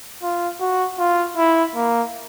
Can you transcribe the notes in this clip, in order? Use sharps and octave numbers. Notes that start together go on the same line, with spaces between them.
F4
F#4
F4
E4
A#3